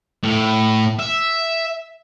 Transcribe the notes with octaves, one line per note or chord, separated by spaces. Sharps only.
A2
E5